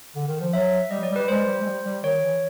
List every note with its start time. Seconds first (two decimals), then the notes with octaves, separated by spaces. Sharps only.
0.16 D3
0.28 D#3
0.41 F3
0.53 F#3 E5
0.91 G3 D#5
1.00 F#3 D5
1.11 G3
1.16 B4
1.28 G#3 C5
1.47 G3
1.62 G#3
1.66 G3
1.85 G3
2.03 D#3 C#5
2.22 E3